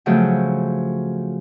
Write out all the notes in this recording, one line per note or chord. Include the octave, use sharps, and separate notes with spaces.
C#3 F3 F#3 A3 C4